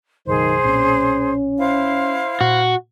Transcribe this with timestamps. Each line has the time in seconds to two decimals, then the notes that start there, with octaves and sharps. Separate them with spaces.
0.27 F#1 B1 D#3 G#4 C5
0.64 B1 A#2 C4 C#4
1.59 E4 C5 F5
2.41 A#2 F#4